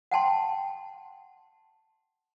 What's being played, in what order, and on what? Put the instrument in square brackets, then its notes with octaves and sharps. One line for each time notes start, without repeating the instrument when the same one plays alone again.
[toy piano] F#5 G5 A5 C6